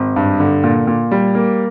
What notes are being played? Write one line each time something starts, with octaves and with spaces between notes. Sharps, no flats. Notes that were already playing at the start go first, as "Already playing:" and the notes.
Already playing: G#1
G2
D3
A#2
A#2
G3
A#3